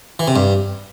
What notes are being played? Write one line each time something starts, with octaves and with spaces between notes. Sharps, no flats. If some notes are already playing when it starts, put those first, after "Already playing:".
E3
C3
G2